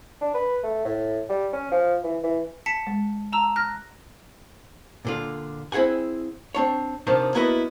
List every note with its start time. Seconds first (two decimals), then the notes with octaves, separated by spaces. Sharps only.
0.21 D4
0.34 B4
0.63 A3
0.85 A2
1.29 G3
1.53 C#4
1.71 F3
2.03 E3
2.23 E3
2.66 A5 B6 C#7
2.87 G#3
3.33 A5 A#5 E6
3.56 F6 F#6 A#6
5.05 A#2 D3 F4
5.72 C4 E4 G#4 F#5 G#5
6.55 C4 D4 C#5
7.07 C3 D#3 F3 D4
7.34 A#3 B3 E4 F#4 B4 D#5